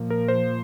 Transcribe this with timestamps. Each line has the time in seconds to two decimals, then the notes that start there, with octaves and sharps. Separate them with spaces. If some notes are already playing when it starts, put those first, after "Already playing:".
Already playing: A#2 F3 A#3
0.10 A#4
0.28 C5